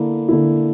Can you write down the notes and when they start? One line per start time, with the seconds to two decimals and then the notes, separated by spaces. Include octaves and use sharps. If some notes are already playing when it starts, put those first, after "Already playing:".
Already playing: D3 A#3 E4
0.28 D3 A#3 E4